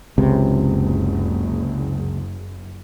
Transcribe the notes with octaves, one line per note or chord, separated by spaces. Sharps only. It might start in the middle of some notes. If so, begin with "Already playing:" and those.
F#1 C#2 C3